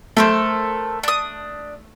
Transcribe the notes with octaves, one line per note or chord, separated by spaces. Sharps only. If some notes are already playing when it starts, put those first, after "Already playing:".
A3 A4 A#4 C5
D4 D#6